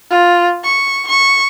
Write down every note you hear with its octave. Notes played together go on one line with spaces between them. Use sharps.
F4
C#6
C#6